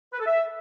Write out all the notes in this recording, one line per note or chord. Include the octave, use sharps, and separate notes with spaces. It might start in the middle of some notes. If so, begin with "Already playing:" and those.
B4
A4
E5